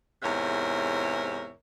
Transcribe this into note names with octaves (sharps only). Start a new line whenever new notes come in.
E2 G#2 C3 A#4 C#5 E5